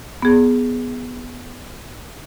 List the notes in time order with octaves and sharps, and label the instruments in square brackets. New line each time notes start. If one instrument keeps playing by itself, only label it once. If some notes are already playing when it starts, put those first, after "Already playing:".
[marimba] B3 G#4